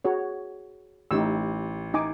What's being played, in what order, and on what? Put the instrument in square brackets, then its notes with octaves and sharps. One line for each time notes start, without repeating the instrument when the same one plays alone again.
[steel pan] F#4 G#4 C#5
[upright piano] A1 [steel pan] D#4 G4 E6
[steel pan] D#4 G#5 D6